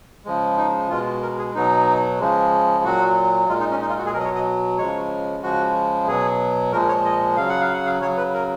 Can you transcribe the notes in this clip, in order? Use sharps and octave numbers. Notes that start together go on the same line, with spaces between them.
C#3 F3 G#3
D#4
B2 G#3 F4
A#4
G#4
B2 F#3 D#4
C#3 F3 G#3
A#2 F#3 F#4
A#2 G#3 F4
D#4
C#4
D#4
F4
F#4
G#4
B2 F#3 A#4 D#5
C#5
D#5
C#3 F3 G#3 C#5
C#3 F3 G#3 F#4
B2 F#3 G#4
A#2 F3 G#3 A#4
C#5
D#5
C#3 F#3 F5
F#5
F5
F#5
F5
C#3 F#3 C#5
B4
A#4